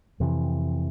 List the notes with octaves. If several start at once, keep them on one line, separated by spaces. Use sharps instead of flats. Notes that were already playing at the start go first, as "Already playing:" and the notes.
F2 C3 E3